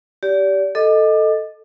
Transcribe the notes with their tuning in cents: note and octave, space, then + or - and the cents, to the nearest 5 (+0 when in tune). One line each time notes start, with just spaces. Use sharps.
G4 -10 D5 -30
A4 +0 D#5 +0 D6 +30